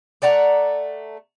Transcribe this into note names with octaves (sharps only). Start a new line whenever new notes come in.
A3 D5 F#5 A#5